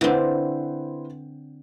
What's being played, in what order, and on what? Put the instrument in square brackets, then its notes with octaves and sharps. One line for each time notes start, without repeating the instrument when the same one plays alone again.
[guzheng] D3 C4 [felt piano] E4 B4 C5